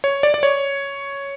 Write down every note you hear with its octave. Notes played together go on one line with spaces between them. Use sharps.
C#5
D5
D5
C#5